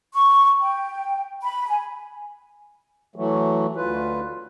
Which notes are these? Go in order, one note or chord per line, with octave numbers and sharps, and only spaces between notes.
C#6
G5
B5
G#5
E3 F#3 A3
D2 F4 B4